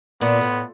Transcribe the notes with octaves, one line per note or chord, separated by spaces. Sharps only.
A#2 B3
A2